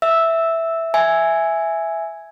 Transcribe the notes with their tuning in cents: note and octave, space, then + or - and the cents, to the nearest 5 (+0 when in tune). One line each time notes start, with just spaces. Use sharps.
E5 +0 E6 -5
E5 +0 G#5 +0